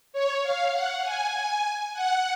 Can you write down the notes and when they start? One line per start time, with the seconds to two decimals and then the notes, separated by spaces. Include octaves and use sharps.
0.13 C#5
0.43 F5
0.73 F#5
1.03 G#5
1.94 F#5